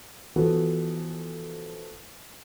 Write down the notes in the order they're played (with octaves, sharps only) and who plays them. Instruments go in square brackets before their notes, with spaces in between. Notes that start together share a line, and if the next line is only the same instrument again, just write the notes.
[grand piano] E3 F3 B3 F#4 A4